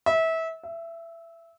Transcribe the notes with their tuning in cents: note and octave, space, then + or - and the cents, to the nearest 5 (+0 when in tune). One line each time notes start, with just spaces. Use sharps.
E5 -25
E5 +20